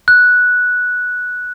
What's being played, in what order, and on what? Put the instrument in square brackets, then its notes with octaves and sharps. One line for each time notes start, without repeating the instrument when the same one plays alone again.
[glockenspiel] F#6